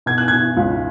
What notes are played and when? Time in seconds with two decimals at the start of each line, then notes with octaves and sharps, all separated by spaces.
0.06 B2 G#6
0.18 F#6
0.28 B2 G#6
0.57 C#2